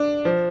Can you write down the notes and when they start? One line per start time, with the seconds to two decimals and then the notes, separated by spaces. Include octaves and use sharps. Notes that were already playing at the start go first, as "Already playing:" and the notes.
Already playing: D4
0.25 F3